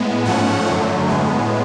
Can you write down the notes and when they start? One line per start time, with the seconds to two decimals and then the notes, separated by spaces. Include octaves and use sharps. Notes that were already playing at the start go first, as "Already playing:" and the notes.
Already playing: A2 G#3 B3
0.25 G#2 F3 A3 C#4 F#5
0.67 F#2 D3 F#3 A3
1.09 A2 G#3 B3